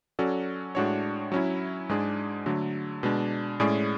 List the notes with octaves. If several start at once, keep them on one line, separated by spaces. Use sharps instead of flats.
F#3 C#4 F#4 A4 D5
A2 G#3 D4 F#4 C#5
F#3 C#4 E4
G#2 G#3 D4 G#4
D3 F#3 A3
B2 G#3 D4
A2 G#3 C#4 G#4 D5